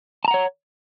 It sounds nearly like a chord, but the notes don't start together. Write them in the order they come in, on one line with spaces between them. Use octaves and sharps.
A5 A#5 F#5 C#5